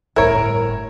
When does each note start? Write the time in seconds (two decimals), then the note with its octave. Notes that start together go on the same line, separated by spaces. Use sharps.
0.16 G1 A2 E4 A#4 C#5